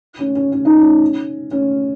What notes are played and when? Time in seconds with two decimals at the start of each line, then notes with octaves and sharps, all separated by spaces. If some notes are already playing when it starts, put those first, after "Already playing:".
0.19 C#4
0.35 C#4
0.52 C#4
0.65 D#4
0.78 C#4
1.51 C#4